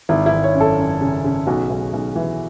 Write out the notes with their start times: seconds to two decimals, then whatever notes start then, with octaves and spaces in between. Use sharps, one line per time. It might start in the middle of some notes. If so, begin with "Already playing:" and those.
0.09 G#1 E4
0.26 E4
0.32 G#1
0.44 C#5
0.54 F#2
0.60 A4
0.78 F#2
1.01 C#3
1.24 C#3
1.47 B1 F#4
1.70 B1
1.93 B1
2.16 E3